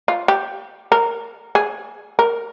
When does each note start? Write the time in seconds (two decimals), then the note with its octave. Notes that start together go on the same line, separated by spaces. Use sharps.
0.08 F4
0.28 G4
0.92 A#4
1.55 G#4
2.19 A#4